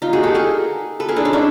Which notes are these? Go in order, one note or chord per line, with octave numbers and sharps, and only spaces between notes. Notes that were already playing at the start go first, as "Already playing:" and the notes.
D#4 F4
F#4 G#4
G4 A4
G#4 A#4
A4 B4
G#4 A#4
D4 E4
C#4 D#4
D4 E4